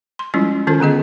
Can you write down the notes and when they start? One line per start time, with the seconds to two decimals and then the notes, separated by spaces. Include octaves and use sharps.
0.19 C6
0.34 F3 G3 G#3 C#4 E4 F4
0.67 D#3 C#4 F4 A4 C5
0.80 D3 B3 G#4 D#5